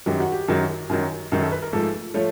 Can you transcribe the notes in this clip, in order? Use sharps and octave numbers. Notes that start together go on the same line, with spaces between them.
F#2 D#3 F#3 G4
F#4
G4
F#2 D#3 F#3
F#2 D#3 F#3
F#2 D#3 F#3
A4
B4
A#4
G#2 F3 A3 A4
F3 A3 C#5